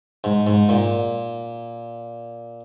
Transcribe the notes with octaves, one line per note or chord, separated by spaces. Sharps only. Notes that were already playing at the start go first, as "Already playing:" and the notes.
G#2
G#2
A#2